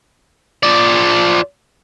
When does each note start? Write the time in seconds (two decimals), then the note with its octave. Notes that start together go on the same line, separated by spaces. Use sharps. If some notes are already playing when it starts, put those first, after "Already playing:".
0.63 F3 D5